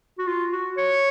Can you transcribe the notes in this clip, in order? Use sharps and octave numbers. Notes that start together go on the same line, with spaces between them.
F#4
F4
F#4
C#5